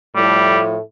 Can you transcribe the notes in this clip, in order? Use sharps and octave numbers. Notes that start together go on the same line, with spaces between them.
A2 F3 G3 A3 E4